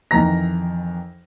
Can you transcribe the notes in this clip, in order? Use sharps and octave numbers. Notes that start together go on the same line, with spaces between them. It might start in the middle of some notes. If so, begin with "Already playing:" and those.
F2 D#3 E3 A#5 A#6